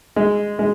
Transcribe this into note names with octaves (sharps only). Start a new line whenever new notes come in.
G#3
G#3